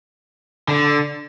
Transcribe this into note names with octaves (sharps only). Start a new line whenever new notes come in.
D3